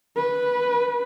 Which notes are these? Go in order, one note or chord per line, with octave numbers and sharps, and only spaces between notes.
B4